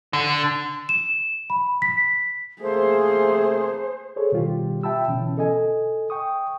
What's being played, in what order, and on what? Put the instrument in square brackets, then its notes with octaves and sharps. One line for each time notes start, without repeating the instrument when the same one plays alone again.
[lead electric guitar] D3
[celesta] E7
B5
B6
[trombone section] C3 A3 A#3 [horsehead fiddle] G#4 [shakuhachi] C5
[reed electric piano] G#4 A4 C5 C#5
B2 D#3 G3 F4 G4
E5 G5 A5 B5 E6
B2 D3 E3 C#4
A4 D#5 G#5
G5 C#6 D#6